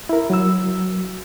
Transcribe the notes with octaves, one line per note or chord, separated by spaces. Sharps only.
E4 A#4
F#3 E6